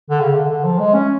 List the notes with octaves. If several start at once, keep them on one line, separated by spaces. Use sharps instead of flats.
D3
C#3
D3
D3
F3
G#3
C#4